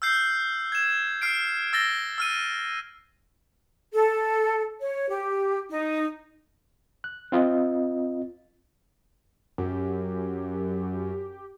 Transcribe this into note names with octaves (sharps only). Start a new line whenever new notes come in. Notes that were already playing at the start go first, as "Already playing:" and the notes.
E6 F6 G6 C7
G#6 E7
F6 C7 D7
E6 A6 A#6 G7
E6 F6 D#7
A4
C#5
G4
D#4
F#6
C4 F4 D#5
F#2 G4